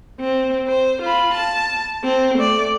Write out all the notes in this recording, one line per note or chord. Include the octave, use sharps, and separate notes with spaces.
C4
C5
F4 B5
A5
C4
A3 D5